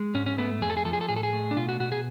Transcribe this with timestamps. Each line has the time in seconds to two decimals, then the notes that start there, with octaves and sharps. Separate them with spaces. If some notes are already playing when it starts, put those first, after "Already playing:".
Already playing: G#3
0.14 G#2 C#4
0.26 C#4
0.38 A3 B3
0.62 F2 G#4
0.70 A4
0.77 G#4
0.85 F3 A4
0.93 G#4
1.01 A4
1.09 A2 G#4
1.16 A4
1.23 G#4
1.33 A3
1.51 D4
1.57 B2 F4
1.69 F#4
1.80 B2 F#4
1.92 G#4